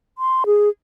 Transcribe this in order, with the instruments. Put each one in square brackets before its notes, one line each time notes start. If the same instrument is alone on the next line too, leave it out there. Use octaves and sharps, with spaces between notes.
[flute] C6
G#4